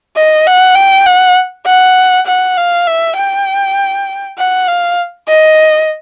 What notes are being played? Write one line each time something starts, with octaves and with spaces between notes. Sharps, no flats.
D#5
F#5
G5
F#5
F#5
F#5
F5
E5
G5
F#5
F5
D#5